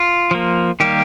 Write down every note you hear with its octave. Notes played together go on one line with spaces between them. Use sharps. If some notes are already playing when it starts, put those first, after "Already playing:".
Already playing: F4
F3 A#3
D#3 G3 A#3 G4